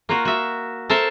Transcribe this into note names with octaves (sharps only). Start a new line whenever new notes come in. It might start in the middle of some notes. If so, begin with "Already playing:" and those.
A#3 F4 F#4
F#4 E5
A4 A#4 C5 E5 A5